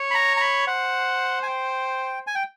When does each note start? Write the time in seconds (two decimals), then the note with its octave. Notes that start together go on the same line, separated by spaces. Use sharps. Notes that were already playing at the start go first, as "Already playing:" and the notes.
Already playing: C#5
0.11 B5
0.14 A#5
0.37 A#5
0.41 B5
0.67 C5 F#5
1.43 G#5
1.47 G5
2.27 G#5
2.35 G5